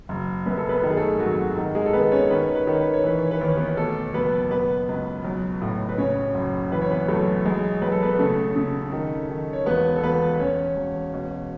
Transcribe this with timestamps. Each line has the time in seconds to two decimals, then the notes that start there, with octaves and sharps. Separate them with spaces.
0.09 F#1
0.46 F#2 B4
0.57 A4
0.69 B3 B4
0.82 D#3 A4
0.90 G#4
0.97 A3 A4
1.20 G#1 F#3 F#4
1.57 D#3
1.75 G#3 G#4
1.86 A4
1.93 D#3 B3 B4
2.11 C#4 C#5
2.30 D#3 B4
2.43 C#5
2.55 B4
2.67 D#3 C#5
2.81 B4
2.93 C#5
3.04 E3 B4
3.19 C#5
3.31 B4
3.41 D#2 C#5
3.57 B3 B4
3.68 B4
3.77 B2 A3 A4
4.14 F#1 B3 B4
4.51 B2 B3 B4
4.88 C#2
5.25 B1
5.62 A2
5.89 B4
5.98 C#3 C#4 C#5
6.35 F#1
6.72 E3 B4
6.81 C#5
6.91 B3 B4
7.08 B1 A3 A4
7.45 B1 G#3 G#4
7.82 B1 B4
7.92 A4
8.02 B3 B4
8.19 C#3 A3 A4
8.56 C#3
8.92 D#3
9.30 D#3
9.53 C#5
9.66 E1 B3 B4
9.96 A4
10.03 E1 B3 B4
10.34 B4
10.40 E1 C#4 C#5
10.76 E1
11.14 B2